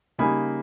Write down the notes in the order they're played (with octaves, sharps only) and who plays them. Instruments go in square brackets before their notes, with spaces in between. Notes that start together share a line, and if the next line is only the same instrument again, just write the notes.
[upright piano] C#3 G3 A#3 D#4 G#5 B5